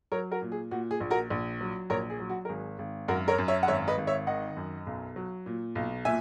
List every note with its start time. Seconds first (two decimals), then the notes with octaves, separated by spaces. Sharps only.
0.12 F#3 A#4 C#5
0.31 F#4 A#4
0.42 A#2
0.52 G#4
0.71 A#2 F#4
0.91 G#4
1.01 A#1
1.11 F#4 A#4
1.30 A#1
1.61 F#3
1.90 A#1 A#4 C#5
2.10 G#4
2.19 F#3
2.30 F#4
2.45 A#4
2.49 G#1 G#4
2.79 G#1
3.08 F#2 F#4 A#4
3.28 A#4 C#5
3.38 F#2
3.48 C#5 E5
3.63 F#5
3.68 G#1 C#5 E5
3.88 B4 D#5
3.98 G#1
4.07 C#5 E5
4.27 D#3 D#5 F#5
4.57 F#2
4.87 B1
5.16 F#3
5.46 A#2
5.75 B1
6.05 A#2 E5 G#5